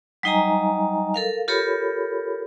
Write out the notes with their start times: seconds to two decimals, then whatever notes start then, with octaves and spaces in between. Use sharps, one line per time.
0.23 F#3 G3 D#4 D#5 G#5 A#5
1.14 A4 A#4 F5
1.48 F4 G4 A4 A#4 C#5 B5